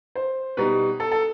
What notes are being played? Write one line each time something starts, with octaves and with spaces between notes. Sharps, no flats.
C5
B2 G3 D#4 B4
A4
A4